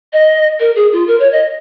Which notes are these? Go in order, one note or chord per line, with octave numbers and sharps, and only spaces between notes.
D#5
A#4
G#4
F4
A#4
C#5
D#5